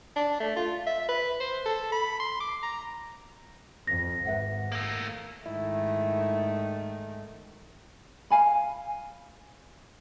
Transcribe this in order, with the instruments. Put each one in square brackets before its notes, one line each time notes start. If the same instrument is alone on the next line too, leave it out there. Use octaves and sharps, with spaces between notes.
[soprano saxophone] D4
A3
F4
E5
B4
C5
A4
B5
C6
D6
A#5
[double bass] F2 [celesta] A#6
[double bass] G#1 [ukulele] B4 E5 F#5
[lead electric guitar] A3 A#3
[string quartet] G#2 D#3 A3 [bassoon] E4
[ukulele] F5 G#5 B5